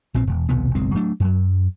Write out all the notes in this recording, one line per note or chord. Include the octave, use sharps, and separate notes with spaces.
A#1 A#2 C4
E1
D#1 B1 C3 B3
F#1 B1 G#3 C4
F#3 A3 D4
F#2 F#3